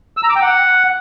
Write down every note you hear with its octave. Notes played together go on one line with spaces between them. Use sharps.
E6
A#5
D6
G5
F#5